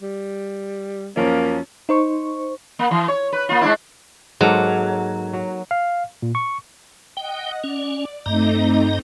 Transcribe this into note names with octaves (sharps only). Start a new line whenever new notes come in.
G3
F#2 F3 A#3 C#4
D#4 C5 C#6
A#3
E3
C#5
B4
A#3 F4
G#3 D4 E4
G#2 F#3 A#3 A4
F#3
F5
A#2
C#6
D#5 F#5 G5
C#4 D5
G2 A3 C4 D#4 D#5 A#5